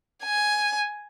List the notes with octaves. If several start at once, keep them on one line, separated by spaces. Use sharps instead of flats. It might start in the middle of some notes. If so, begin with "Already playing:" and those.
G#5